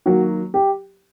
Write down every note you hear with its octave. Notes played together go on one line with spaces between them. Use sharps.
D#3 F#3 A#3 F#4
G4